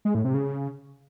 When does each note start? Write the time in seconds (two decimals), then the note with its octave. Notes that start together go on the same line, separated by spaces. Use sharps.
0.05 G#3
0.15 A2
0.24 C3
0.34 C#3